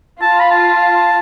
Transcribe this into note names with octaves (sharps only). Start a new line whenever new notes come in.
F4 A5
B5
A5